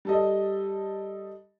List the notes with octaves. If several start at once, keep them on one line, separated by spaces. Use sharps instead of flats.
G3 A4 D#5